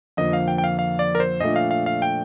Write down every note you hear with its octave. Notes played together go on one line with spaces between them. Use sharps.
F2 D3 F3 A#3 D#5
F5
G5
G5
F5
F5
D5
A#4
C5
A#2 F3 A3 D4 D#5
F5
F5
F5
G5